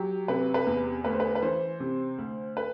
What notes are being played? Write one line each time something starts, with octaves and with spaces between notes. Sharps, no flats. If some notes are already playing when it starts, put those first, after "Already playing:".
Already playing: F#3 G4
C3 B4
B4
E2
D2 B4
C5
B4
B4
E3 C5
C3
D2
B4